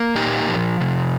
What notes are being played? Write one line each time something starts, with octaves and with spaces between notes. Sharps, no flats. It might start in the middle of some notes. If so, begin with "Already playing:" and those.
Already playing: A#3
A#2 D#4 G4
F3
C3